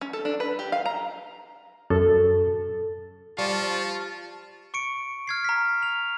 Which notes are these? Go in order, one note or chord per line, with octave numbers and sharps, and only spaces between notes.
C#4
A4
D4
B4
G4
F5
A#5
F#2 A4
G3 F4 C5 F5 A5 C#6
C#6 C#7 D7
F6 G#6 C7
A#5 B6
F7